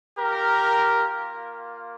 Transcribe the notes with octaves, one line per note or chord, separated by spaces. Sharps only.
A#3 F4 G4 A#4